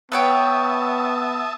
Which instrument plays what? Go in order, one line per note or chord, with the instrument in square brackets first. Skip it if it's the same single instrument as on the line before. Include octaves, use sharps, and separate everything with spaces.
[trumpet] B3 [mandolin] B4 C#5 G5 [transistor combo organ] E5 A5 D#6